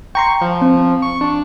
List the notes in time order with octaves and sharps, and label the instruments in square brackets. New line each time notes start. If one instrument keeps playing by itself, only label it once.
[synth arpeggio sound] G5 A#5 C6 [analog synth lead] C#6
[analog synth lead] F3
[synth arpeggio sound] C4
[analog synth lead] C#6
D4